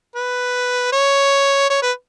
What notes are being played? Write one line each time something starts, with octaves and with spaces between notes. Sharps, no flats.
B4
C#5
C#5
B4